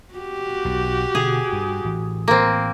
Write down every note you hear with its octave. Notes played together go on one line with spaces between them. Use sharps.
F#4 G4
B1
B2 D3 G#4
G2
A2 E3
A#3 C4